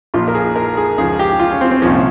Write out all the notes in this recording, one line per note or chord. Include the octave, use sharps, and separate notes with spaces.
A#1 A#2 F3 F4
A#4
G#4
A#4
G#4
C#2 C#3 F3 G#4
G4
F4
C#4
C4
C4
C2 A#2 F3 C#4